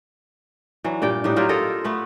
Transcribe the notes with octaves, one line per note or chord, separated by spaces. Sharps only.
E3 F#3 D4
G2 A#2 D5 G5
A2 G3 D4 D#4
F#3 A#3 F4 G4
F4 A4 A#4 D#5
A3 B3 B4